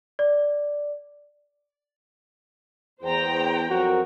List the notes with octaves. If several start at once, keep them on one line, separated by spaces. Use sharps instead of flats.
D5
E2 C5 G5 A#5
F2 F#3 F#4 A#4